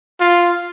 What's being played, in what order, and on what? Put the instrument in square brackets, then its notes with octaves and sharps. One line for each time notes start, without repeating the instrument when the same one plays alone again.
[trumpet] F4